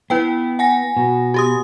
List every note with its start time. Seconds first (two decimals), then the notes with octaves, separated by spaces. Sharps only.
0.10 B3 E4 B4 G5
0.59 F#5 G#5 A#6
0.97 B2
1.34 F#4 G4 D#6